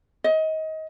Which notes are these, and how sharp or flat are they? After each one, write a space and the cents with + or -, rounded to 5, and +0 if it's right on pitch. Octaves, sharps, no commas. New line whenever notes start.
D#5 +25